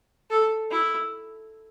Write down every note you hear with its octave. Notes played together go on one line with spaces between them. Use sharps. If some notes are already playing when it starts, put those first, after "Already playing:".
A4
E4